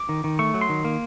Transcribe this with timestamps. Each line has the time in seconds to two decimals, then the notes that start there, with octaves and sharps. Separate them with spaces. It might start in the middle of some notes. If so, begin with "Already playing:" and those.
Already playing: D6
0.09 D#3
0.24 D#3
0.39 A3 C#6
0.54 F#3
0.61 C6
0.69 D#3
0.85 A#3